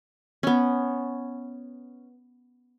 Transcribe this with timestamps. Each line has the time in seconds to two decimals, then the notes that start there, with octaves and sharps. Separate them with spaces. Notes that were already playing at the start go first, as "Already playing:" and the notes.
0.43 B3 C#4